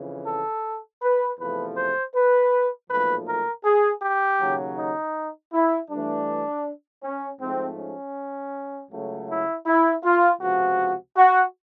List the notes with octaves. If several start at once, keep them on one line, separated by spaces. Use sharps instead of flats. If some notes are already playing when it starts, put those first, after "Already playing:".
Already playing: F2 C#3 E3
A4
B4
E2 C3 F3 A3 B4
C5
B4
B1 A#2 F3 A3 B4
A#4
G#4
G4
D#2 C#3 F#3
D#4
E4
G2 E3 A3 D4
C#4
G#2 F3 A3 C4
C#4
C#2 C#3 F#3 A3
E4
E4
F4
C#2 C3 F3 F#4
F#4